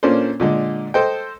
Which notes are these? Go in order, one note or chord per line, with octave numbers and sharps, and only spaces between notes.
A#2 A#3 C#4 D4 A4 C5
A#2 D3 G#3
A4 C5 D#5 G5